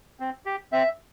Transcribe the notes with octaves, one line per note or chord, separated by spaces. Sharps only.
C4
G4
C4 E5